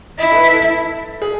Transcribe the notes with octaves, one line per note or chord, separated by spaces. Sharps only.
E4 D#5
A4
B4
A4
G#4